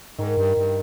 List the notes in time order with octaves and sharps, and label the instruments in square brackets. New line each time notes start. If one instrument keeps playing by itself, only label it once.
[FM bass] G#2 [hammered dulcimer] D#3
[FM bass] G2
G2